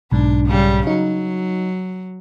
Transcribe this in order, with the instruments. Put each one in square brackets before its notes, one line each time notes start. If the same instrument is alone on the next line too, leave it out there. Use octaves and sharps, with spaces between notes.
[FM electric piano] B1 G#2 [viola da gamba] D4
[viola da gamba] C#3 G3
[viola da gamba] F#3 [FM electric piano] D#4